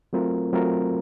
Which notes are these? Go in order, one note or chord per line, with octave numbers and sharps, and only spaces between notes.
F#3 A3 C4 F4 A#4
F#3 A3 C4 F4 A#4